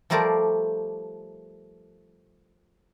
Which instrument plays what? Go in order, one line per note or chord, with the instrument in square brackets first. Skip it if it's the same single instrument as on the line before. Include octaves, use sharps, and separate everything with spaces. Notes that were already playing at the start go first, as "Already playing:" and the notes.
[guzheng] F3 G3 A3 A#4 C5 D5